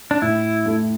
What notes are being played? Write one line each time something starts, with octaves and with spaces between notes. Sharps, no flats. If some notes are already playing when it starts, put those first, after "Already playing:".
D4
A2 E4
A3